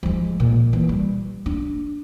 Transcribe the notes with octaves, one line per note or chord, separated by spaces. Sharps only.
F3 G#3
A#2
E3
G3
D4